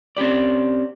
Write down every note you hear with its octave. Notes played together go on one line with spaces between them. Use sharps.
C4 C#4 G4 D5